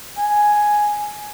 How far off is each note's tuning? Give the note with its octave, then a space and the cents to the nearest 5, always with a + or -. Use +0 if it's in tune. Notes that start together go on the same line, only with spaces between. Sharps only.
G#5 +5